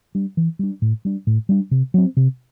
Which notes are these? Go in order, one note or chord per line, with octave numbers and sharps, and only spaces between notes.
G3 D4
E3
G3 D4
A2
G3 D4
A2
G3 D4
C3
F#3 C4
C3